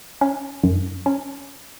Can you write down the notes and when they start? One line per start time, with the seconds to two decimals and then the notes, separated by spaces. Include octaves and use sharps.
0.21 C#4
0.63 F#2
1.06 C#4